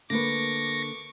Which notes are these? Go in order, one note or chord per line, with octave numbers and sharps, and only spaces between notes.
D3 A#3 B4 C#6 D6 A#6